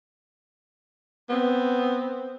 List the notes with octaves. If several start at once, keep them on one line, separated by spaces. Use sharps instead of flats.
B3 C4